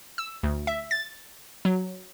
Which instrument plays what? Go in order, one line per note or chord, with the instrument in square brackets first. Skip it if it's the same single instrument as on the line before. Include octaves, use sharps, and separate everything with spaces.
[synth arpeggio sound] E6
D2
E5
A6
F#3